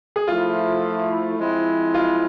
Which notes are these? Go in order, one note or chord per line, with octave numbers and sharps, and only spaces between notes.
G#4
F3 A3 E4 F4
F3 G#3 C4 E4
F4